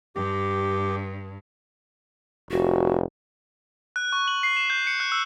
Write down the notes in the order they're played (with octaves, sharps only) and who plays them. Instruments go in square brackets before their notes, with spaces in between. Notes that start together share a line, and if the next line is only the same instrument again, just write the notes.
[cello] G2 [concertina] G4
[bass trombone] F1 [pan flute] F#4
[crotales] F#6
C#6
F#7
C7
E7
G6
C#7
F#6
E6